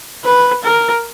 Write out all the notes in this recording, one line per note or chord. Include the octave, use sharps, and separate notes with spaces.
B4
A#4